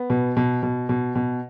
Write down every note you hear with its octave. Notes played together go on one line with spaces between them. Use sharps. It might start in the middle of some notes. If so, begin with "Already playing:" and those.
Already playing: B3
B2
B2
B2
B2
B2